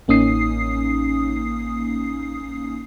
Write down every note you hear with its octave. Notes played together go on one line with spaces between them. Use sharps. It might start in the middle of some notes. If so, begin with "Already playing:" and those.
A1 A#3 C#4 D#4 D#6 C7